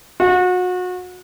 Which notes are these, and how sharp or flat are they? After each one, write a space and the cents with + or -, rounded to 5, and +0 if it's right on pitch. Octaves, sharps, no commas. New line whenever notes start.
F#4 -30